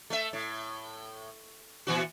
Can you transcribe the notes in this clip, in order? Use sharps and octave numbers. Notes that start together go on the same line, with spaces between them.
A3 E5
A2
A#2 E3 F#4